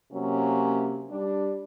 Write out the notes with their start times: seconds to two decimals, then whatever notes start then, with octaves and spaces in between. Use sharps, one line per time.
0.12 C3 F#3 A#3 C#4
1.11 G3 D4